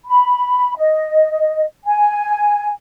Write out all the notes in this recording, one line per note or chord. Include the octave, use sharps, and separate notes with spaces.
B5
D#5
G#5